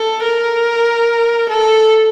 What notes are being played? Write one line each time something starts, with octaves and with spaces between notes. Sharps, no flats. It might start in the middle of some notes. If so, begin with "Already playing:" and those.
Already playing: A4
A#4
A4